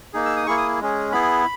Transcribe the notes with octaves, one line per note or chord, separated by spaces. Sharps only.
A#3 D#4 G#4
E6
D#6
A#3 E4 G#4 C#6
D#6
G#3 C#4 G#4
B3 E4 G#4 B5